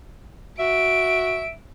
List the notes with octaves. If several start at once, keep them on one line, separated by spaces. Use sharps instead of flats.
F#4 E5 D7